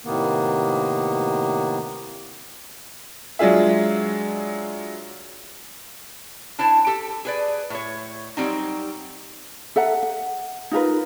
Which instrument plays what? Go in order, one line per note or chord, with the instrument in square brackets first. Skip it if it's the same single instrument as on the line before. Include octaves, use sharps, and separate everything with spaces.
[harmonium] A2 C3 D#3 A#3 B3
[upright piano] F#3 G#3 D4 F4 G#4 E5
[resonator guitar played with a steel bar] D4 E4 C5 A5
G4 A4
G#4 B4 D5
A2 C#5
F#3 G3 C4 D#4
[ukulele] A4 E5 F#5 A#5
F#5
D#4 F4 A#4 B4